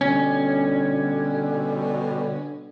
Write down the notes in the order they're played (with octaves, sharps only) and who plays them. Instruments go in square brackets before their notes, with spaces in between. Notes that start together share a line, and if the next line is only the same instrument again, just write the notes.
[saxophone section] B2 D3 G3 [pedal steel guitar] C#4